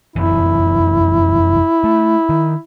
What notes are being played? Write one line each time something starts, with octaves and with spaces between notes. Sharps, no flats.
F1 F#2 E3 E4
A3
D#3